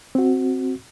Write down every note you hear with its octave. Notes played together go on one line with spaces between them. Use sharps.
C4 F#4